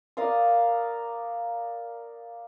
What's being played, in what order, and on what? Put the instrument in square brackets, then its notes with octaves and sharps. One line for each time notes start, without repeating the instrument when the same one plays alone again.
[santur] A#4 D5 F5 D#6